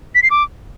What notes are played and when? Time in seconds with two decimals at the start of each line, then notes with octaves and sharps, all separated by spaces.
0.15 B6
0.23 C7
0.30 D6